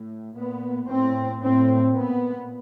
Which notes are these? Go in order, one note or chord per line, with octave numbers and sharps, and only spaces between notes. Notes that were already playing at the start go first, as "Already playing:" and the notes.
Already playing: A2
A#2 B3
A2 C4
A2 C4
A#2 B3